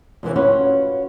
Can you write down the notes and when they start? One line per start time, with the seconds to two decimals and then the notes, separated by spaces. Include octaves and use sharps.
0.23 F2 C3 E3 C#4
0.36 C#4 F4 F#4 B4